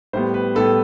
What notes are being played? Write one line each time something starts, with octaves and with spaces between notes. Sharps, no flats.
A2 G3 B3 C5
B4
A2 G3 B3 A4